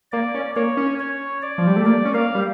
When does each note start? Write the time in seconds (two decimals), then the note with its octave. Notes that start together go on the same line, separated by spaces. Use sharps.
0.12 A#3 D5
0.34 C#4
0.56 A#3 C#5
0.77 C#4
0.99 C#5
1.42 D5
1.58 F3
1.67 G3
1.76 A3
1.86 A#3 D5
2.05 C#4
2.14 A#3 F5
2.35 G3